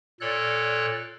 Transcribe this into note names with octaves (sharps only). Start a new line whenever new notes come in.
A#2 A4 C#5 D5 F#6